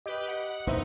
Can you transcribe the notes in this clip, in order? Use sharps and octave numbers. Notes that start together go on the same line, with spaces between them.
G4 B4 D#5
F#5
A1 F2 A#2 D#4 B4 C5 E5